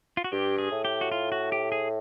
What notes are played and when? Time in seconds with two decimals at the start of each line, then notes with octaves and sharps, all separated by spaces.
0.17 F4
0.24 F#4
0.32 G2 G4
0.58 G#4
0.71 A2
0.85 G4
1.01 F#4
1.12 F4
1.32 F#4
1.52 G4
1.72 G#4